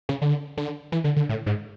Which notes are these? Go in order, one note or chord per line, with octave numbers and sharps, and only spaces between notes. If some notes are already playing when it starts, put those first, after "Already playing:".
C#3
D3
D3
E3
D3
D3
A2
G#2